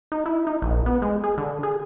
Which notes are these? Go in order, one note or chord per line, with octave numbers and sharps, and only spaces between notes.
D#4
E4
D#4
A#1
B3
G#3
G#4
D3
G#4